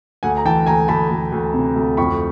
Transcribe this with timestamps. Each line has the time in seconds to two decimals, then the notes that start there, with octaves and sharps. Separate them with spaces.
0.23 D2 F#5 G#5
0.37 A#5
0.45 E3 G5 A5
0.66 D2 G#5 A#5
0.88 D2 A5 B5
1.10 D2
1.32 D2
1.54 C3
1.76 D2
1.97 F2 B5 C#6